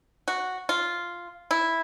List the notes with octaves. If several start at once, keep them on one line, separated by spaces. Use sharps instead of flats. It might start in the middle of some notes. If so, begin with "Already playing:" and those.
F#4
F4
E4